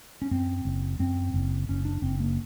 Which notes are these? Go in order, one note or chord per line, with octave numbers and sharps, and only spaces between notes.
C#4
F#2 C4
F#1
F#2 C4
F#1
F#1 C#4
D4
F#1 C4
A#3